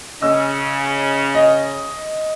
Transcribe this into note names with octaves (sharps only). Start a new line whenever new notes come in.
C#3 C#4 D#5 E6
D#5